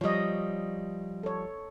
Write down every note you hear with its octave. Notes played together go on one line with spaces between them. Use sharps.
F3 G3 C#5 D#5
A4 C#5